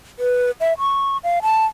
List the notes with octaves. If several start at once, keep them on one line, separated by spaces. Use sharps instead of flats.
B4
E5
C#6
F5
A5